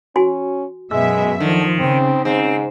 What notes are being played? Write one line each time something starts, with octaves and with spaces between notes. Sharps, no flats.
C#4 F#4 G#5 C6
F#2 B2 G#3 E5 E6
D3 D#3 F3
C#3 C4
G#2 C4